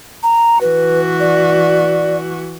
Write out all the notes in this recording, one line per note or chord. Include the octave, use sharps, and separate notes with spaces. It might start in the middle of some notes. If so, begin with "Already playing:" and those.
A#5
E3 F#4 B4
D5